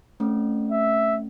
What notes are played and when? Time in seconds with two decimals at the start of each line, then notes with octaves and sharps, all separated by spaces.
0.20 A3 C4 C#4
0.72 E5